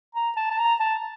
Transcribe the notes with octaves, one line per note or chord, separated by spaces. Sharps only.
A#5
A5
A5
A#5
A5